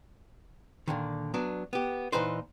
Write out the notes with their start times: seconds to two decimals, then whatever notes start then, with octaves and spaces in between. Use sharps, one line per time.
0.88 A#2 D3 D#3
1.34 F#3 B3 D4
1.73 B3 G4
2.12 A#2 E3 D#4 B4 C5